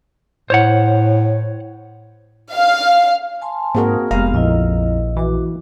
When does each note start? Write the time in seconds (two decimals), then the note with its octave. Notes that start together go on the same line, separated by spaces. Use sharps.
0.50 A2 C5 C#5 F#5
2.53 F5
3.42 G#5 A5 C6
3.75 G#2 A#3 C4 F#4 G#4 A#4
4.11 F1 G#3 B3 G4 F5 A#5
4.34 A#1 F2 E4 D#5
5.17 E3 F#4 D6